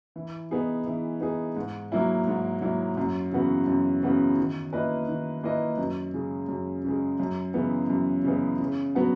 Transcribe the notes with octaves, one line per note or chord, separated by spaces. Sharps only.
E3
B3 D#4 G#4
E3
B3 D#4 G#4
G#2
F#3 A#3 E4
G#2
F#3 A#3 E4
F#2
C#3 E3 B3 F#4
F#2
C#3 E3 B3 F#4
D#3
A#3 E4 B4 D#5
D#3
A#3 E4 B4 D#5
F#2
C#3 G#3
F#2
C#3 G#3
F#2
C#3 E3 G#3 B3
F#2
C#3 E3 G#3 B3
C#3
F#3 B3 F#4